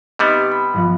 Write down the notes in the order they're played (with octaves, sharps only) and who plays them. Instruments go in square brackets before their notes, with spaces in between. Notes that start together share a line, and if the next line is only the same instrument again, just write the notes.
[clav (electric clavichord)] C3 G3 B3 [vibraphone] D#4 G4 D#5
[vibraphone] B5
[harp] G1 F3 F#6